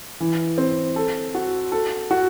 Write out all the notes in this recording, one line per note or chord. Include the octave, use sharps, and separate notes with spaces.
E3
C4
A4
F#4
A4
F#4